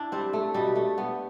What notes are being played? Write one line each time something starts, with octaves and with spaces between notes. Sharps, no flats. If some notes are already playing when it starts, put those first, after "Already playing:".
Already playing: D4 E4
G3 C4
A3
B2 G3
A3
G3 B3